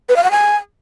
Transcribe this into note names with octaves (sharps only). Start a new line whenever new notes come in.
B4
F5
F#5
G#5